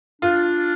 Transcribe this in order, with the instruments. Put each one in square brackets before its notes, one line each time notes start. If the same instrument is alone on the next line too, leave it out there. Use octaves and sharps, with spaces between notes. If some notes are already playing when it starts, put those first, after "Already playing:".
[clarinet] D4 [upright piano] F4